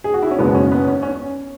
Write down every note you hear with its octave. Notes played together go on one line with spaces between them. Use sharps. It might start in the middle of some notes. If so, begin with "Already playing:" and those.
G#4
F#4
E4
C#4
F#1 E2 B2 G#3 B3
C#4
B3
C#4
C#4